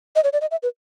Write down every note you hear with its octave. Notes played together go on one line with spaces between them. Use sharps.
D#5
C#5
D5
D#5
E5
B4